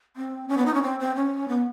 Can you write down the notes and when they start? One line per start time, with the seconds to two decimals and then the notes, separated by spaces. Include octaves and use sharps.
0.16 C4
0.49 C#4
0.57 B3
0.66 D#4
0.74 C#4
0.83 C4
1.00 C4
1.15 C#4
1.48 B3